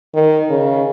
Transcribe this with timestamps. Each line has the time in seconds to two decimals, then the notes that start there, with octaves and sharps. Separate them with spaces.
0.14 D#3
0.50 C#3